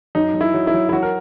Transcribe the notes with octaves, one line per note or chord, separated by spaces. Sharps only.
F#2 D#4
F#2
E4
F#3
E4
F#3
E4
F#3 F#4
A#4